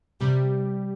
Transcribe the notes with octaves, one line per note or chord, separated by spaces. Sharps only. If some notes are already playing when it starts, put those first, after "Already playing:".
C3 G3 G4